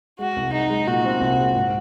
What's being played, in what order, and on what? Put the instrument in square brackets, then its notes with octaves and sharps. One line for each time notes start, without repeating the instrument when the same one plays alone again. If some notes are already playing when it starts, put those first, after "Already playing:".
[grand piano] G#3 [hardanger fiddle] F#4
[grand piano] C2
[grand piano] G#3 [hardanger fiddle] D#4
[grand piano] G#3
[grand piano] A#2 [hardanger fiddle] F#4
[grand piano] C4
C2
G#3
G#2